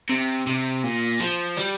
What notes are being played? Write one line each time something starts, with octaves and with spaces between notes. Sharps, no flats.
C3
C3
A#2
F3
G3